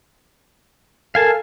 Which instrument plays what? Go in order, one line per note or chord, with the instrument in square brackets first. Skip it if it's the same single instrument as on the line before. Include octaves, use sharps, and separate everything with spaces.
[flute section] A4 A#4 [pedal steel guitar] F5 G#5 A5